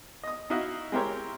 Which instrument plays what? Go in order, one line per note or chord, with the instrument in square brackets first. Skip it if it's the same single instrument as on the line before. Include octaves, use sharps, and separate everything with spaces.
[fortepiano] D#5 D#6
D#4 E4 F#4 D#5 F5
G#3 C4 E4 G4 A#4 C#5